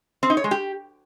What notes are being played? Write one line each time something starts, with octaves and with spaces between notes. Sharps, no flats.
C4
D#4
C#5
G#3
G4